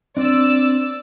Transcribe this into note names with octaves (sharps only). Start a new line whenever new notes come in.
C4 D4 D5 E6